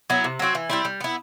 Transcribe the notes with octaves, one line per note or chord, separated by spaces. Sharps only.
F#3 B3 E4
C3
F#3 C4 F#4
E3
G3 C4 E4
G3
B3 E4